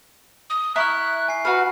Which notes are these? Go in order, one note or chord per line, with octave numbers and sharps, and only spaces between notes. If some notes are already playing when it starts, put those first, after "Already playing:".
D#6
E4 A#5 C#6 F6 F#6
G#5 C7
F#4 B4 F6